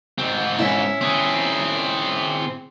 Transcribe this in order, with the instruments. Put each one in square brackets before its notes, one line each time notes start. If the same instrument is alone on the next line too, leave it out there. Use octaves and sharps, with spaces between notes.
[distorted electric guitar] G#2 C4
[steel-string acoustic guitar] C#4 E4
[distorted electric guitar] C4 G#4